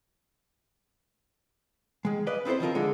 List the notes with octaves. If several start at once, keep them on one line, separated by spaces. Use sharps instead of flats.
D#3 G#3
B4 D5 D#5 F5
B3 C4 E4 A4 C5
D#3 F3 F4 A#4
E2 D3 G#3